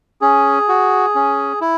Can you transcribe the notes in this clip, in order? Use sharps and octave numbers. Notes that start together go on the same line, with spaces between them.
C#4 G#4
F#4
C#4
E4